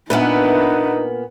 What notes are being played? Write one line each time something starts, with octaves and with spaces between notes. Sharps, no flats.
A#2 A#3 B3 D4 D#4 B4 E5 F#5